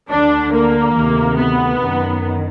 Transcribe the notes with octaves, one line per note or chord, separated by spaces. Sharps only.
D2 D3 D4
A#3
D2 C3 D#3
B3
F#2 D#3